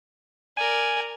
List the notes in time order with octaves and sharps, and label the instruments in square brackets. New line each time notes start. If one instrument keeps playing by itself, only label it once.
[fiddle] A#4 D5 [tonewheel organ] G#5